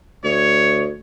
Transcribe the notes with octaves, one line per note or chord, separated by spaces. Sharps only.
D2 C#5